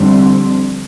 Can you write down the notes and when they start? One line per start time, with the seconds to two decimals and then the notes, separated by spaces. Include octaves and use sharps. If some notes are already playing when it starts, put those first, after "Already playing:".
Already playing: F2 D3 G3 C4